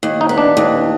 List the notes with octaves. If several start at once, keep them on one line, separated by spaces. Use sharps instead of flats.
D#2
D#4
B3
D4
D#2